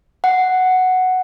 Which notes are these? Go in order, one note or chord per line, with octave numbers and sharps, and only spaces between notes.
F#5